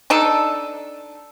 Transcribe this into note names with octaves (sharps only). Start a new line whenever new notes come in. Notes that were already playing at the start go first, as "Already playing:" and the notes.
D4 D#4 A4